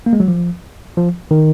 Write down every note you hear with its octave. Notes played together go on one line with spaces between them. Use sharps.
A#3
G#3
F#3
F3
F3
D#3